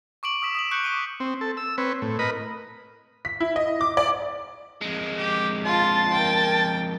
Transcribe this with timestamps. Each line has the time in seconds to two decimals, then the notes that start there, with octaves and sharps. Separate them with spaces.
0.23 C#6 D6 D7 F#7
0.42 D#6 E6 B6 E7
0.55 D#6 E7 F#7
0.71 C#6 F#6 G6 C#7
0.84 D6 D#7 G7
1.20 C4
1.41 A4
1.57 E6
1.78 C4 B4 C#5
2.02 A2
2.19 A#4 B4 D#5 B5
3.25 B6
3.40 E4
3.56 D#5
3.81 D6
3.97 D5
4.81 F2 G#3
5.18 G4
5.65 F4 A5
6.12 A#4 G5